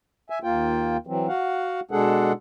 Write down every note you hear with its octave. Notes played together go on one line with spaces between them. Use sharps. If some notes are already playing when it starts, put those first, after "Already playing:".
E5 G#5
D#2 A#3 F4 G5
E3 F#3 C4
F#4 F5 F#5
B2 G#3 D4 G#4 A4 F#5